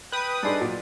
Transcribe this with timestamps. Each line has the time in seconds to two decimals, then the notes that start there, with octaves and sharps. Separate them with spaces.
0.12 B4 G5 D#6
0.43 G2 D4 D#4 G#4 A4 D5 C6
0.61 A#2 F#3